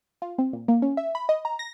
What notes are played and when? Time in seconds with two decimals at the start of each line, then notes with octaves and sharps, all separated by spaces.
0.22 F4
0.38 C4
0.53 A#2
0.68 A#3
0.82 C#4
0.97 E5
1.15 B5
1.29 D#5
1.45 A#5
1.59 A#6